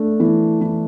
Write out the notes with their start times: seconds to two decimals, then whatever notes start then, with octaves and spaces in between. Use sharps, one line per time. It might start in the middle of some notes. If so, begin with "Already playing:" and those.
Already playing: A3 D4
0.20 E3
0.61 E3